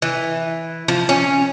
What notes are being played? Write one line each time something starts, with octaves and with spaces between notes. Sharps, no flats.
E3
F3
C#4